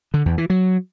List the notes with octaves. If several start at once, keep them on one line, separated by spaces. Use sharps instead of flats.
D3
E2
E3
F#3